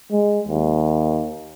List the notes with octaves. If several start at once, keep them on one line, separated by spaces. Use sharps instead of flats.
G#3
D#2